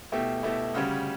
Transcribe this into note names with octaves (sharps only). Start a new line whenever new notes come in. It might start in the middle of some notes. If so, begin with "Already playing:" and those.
B2 A3 E4 G4
B2 A3 E4 G4
D2 C#3 G3 C#4